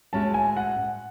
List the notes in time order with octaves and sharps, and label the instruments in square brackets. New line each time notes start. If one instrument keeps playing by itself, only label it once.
[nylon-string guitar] A2 G#3 C#4 F#4 [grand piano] A5
[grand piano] G#5
F#5